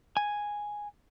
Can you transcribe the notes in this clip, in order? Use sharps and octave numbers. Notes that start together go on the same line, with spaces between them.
G#5